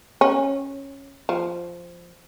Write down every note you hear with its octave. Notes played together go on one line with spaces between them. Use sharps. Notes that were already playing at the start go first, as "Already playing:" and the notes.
C#4
F3